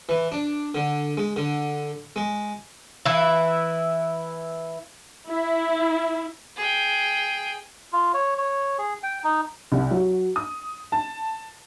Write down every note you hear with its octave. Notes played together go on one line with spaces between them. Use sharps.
E3
D4
D3
G#3
D3
G#3
E3 E4
E4
G#4 G5
F4
C#5
C#5
G#4
G5
D#4
C2
F#3
D#6
A5